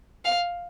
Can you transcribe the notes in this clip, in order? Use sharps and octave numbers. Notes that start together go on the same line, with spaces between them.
F5